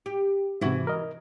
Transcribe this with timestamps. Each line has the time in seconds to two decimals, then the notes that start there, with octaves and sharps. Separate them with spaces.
0.06 G4
0.61 G#2 C3 E3 E4 F#4
0.87 A#4 D#5